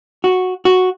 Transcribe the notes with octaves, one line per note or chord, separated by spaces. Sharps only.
F#4
F#4